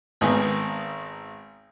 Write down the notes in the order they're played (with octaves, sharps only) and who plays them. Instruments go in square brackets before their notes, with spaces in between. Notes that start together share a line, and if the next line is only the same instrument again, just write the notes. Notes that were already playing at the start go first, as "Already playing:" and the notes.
[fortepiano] G#1 D#3 G#3 B3 G#5